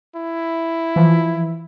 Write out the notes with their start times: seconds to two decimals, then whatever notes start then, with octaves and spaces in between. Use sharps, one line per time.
0.16 E4
0.96 E3 F3